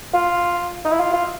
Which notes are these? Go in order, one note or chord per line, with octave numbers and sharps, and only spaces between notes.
F4
D#4
E4
F4
F4